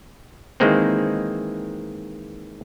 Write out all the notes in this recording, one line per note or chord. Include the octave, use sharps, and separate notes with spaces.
D#3 E3 G#3 A#3 C4